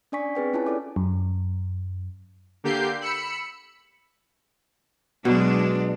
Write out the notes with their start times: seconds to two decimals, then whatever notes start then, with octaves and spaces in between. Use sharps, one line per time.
0.12 C#4 D4 D5 G#5 C#6 B6
0.35 C4 G#4 B4 G5
0.53 C#4 E4 F4 C#5 G#5 A5
0.67 E4 A4 D5 D6
0.96 F#2
2.64 D3 A#3 G4 G6 C7
3.01 B5 E6 C#7
5.25 B2 F#3 G#3 D4